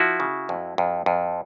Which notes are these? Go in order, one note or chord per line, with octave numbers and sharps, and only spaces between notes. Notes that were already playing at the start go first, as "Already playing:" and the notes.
Already playing: F3 E4 F#4
C#3
F2
F2
F2